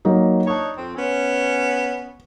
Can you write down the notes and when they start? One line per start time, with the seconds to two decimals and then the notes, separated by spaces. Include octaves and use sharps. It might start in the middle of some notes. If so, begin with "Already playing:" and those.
0.05 F#3 A#3 D#4
0.47 D4 D#4 C#5 C#6
0.77 F2 C4
0.96 B3 C#4